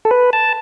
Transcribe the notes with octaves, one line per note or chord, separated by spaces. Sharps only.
A4
B4
A5